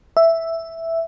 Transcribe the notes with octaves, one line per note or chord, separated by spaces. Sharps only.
E5